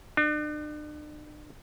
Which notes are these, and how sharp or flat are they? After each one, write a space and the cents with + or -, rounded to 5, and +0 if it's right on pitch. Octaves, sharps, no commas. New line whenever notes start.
D4 +40